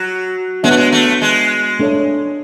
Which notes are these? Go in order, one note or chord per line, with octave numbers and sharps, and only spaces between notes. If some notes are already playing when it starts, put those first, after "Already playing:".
Already playing: F#3
G#3 B3 D4 F#4 C#5 E5
A3
G#3
A3
G#3
A3 D4 A4 C#5